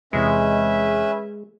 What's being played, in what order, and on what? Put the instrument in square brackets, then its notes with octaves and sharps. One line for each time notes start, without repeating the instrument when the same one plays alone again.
[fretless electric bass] E2 C3 [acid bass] G#3 [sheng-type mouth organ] C#4 B4 E5